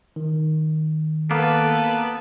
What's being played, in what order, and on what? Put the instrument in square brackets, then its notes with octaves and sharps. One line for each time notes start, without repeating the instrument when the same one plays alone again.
[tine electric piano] D#3
[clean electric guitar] A#3 B3 [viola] A4 B4